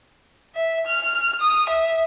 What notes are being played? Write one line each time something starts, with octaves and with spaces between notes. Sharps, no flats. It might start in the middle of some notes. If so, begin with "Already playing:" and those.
E5
F6
D#6
E5